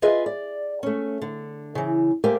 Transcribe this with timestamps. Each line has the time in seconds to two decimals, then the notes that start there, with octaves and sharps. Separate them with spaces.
0.02 F4 G#4 B4 D#5 E5
0.26 D5
0.83 A3 C#4
1.22 D3
1.75 C#3 E3
2.24 A3 A#3 G4 C5 G#5